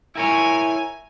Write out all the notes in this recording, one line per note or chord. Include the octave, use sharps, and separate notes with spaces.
E4 A#4 C#5 G#5